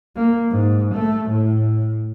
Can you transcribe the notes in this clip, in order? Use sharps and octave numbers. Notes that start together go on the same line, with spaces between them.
A#3
G#2
A3
A2